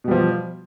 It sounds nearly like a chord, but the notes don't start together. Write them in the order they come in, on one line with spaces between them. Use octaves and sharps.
B2 G3 F3